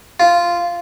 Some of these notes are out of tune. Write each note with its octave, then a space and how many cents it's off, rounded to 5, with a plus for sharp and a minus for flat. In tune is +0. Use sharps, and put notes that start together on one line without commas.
F4 -10